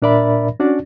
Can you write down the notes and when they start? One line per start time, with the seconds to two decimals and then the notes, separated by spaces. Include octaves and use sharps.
0.02 A#2 D4 A#4 D5 E5 B5
0.60 C#4 D4 F#4 D5